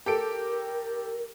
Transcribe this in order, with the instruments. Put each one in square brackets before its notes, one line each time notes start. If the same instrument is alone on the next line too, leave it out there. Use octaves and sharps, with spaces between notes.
[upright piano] G4 A4 D7 [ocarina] A#4